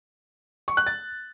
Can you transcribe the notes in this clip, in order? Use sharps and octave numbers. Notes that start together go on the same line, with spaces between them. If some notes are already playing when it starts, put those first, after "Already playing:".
C#6
F#6
A6